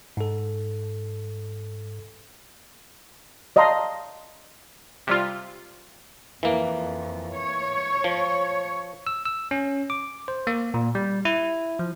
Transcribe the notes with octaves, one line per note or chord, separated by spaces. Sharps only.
G#2 A4
D5 D#5 F5 A5 A#5 C6
C3 G3 F4
F2 E3 A#3
C#5
F3
E6
E6
C#4
D6
C5
A#3
A#2
G3
E4
F3